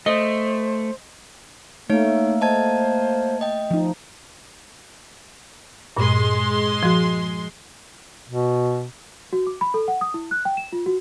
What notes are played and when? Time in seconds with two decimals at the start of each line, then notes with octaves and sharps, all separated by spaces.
0.06 A3 C5 D#5
1.90 A3 A#3 D#4 C#5
2.41 C5 D#5 A5 G#6
3.41 D#5 G5
3.71 F3 D#4
5.97 G2 A#2 G#3 C6
6.83 F3 F#4
8.29 B2
9.33 F#4
9.47 D6
9.61 B5
9.74 A4
9.88 F#5
10.01 D#6
10.14 E4
10.31 F#6
10.45 G5
10.57 E7
10.72 F4
10.86 F#4